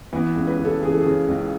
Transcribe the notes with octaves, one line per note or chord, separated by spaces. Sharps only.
E3 B3
C#2
B4
C#3
A4
E3 G#4
A4
C#3 G#4
C#2